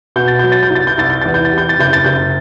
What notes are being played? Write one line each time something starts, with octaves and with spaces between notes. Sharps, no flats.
B2 G6
A6
F#3 G6
A6
G6
C2
A6
G6
C2 A6
G6
E2 A6
G6
A6
C3
G6
A6
F#1 G6
A6
F#1 G6